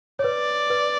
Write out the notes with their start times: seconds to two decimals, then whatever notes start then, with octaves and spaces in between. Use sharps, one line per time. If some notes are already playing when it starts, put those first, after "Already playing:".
0.19 C#5
0.24 B4 D5
0.70 B4